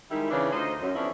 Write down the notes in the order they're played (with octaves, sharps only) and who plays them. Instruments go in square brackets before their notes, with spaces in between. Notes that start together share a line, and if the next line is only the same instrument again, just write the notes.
[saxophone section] D#3 G3 G#3 E4
C#3 E3 D4
D2 D#4 F4 C5 D#5
F#2
F2 D3 B3 C#4 D4 E4